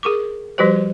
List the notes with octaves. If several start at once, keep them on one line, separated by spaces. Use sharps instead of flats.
G#4 A#4 C#6 D6
F3 G3 F#4 G4 B4 C5